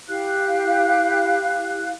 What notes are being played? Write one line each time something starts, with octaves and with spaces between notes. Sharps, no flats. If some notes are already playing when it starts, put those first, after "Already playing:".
E4 G4 F5 F#6